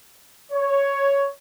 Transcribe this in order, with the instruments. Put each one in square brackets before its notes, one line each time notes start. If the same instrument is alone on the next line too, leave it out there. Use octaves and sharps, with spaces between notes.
[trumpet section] C#5